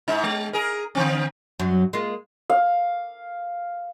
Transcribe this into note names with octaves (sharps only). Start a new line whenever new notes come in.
G#2 D#4
G#3
G#4 A#4
D3 E3 C4
F#2 F#3
G#3 A#3 F4
F5